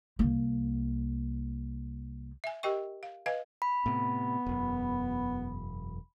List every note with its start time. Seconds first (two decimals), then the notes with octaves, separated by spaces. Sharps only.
0.19 C2 A#3
2.44 E5 G#5
2.63 G4 A#4 D#5 G5 C#6
3.03 F5
3.26 B4 D#5 F5 G#5
3.62 B5
3.86 A2 C3 B3
4.46 E1 F#2